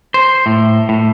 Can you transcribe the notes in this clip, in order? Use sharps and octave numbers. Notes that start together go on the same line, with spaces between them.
C5
A2
A2